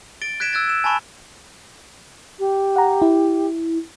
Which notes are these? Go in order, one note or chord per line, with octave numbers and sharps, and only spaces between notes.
A6 D7 G7
F#6 G#6 B6 D7 E7
E6 F#6 G#6 A6
E6 E7
G#5 A5 B5 C#6 E7
G4
F#5 A#5
E4